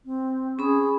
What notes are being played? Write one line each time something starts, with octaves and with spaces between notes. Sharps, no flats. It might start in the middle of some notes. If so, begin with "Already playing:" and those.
C4
C#4 G#4 B5